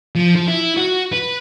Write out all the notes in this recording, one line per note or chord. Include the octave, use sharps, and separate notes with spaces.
F3
F3
E4
F#4
B4